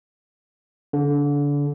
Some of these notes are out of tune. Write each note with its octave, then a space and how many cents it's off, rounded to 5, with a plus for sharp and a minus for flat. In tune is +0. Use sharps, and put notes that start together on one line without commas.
D3 -30